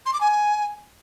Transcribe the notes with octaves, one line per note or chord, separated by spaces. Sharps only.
C6
D6
G#5